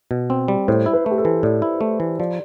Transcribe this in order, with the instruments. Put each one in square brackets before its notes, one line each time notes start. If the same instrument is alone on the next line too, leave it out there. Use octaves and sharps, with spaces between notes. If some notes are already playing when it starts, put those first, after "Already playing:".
[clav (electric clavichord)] B2
C4
G3
[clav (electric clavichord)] A2 [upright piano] C5
[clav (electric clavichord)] E4
[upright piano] B4
[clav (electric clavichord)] A3 [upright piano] G4
[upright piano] A4
[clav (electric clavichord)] E3
[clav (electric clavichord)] A2 [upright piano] D5
[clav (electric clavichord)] E4
A3
E3
[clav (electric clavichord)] F3 [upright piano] D5